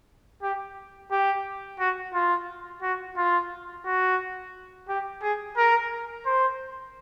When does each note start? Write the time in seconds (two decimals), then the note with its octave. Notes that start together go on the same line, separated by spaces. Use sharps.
0.42 G4
1.11 G4
1.79 F#4
2.14 F4
2.82 F#4
3.17 F4
3.86 F#4
4.88 G4
5.22 G#4
5.57 A#4
6.26 C5